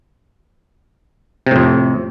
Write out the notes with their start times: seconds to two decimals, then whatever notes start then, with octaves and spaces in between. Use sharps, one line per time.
1.46 C3
1.51 A2
1.56 F2